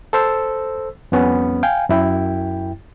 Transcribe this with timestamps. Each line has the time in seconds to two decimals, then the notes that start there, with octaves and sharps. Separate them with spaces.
0.13 A4 C5 E6
1.12 F2 G3 B3 C#4
1.63 F5 G5 G#5
1.89 F#2 E4 G5